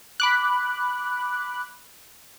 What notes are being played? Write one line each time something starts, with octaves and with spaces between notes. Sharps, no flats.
B5 D6 F#6